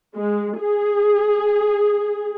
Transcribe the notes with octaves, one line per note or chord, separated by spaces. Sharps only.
G#3
G#4